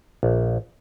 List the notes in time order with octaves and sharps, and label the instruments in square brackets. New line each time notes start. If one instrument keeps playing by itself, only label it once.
[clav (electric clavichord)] A#1